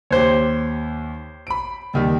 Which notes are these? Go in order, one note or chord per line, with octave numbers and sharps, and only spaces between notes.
D#2 G4 C5 C#5
B5 D7
D#2 D#3 G3